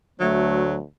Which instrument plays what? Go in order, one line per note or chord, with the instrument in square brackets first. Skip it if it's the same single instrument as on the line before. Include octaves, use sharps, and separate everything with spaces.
[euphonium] D2 [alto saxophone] F#3 [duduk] A3